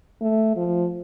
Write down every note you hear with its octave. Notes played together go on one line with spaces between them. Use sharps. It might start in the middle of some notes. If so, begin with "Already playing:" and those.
A3
F3